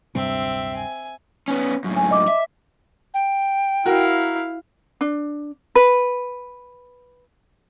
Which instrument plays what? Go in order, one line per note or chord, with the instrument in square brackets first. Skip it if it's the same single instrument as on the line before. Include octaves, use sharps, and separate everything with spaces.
[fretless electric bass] D1 G2 C3 [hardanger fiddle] C4 E5
[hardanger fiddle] G#5
[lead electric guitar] B3 C#4
F#2 A2
[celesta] G#5
D#5 D6
[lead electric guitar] E5
[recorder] G5
[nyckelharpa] E4 F5 [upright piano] F#4 A#4
[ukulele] D4
B4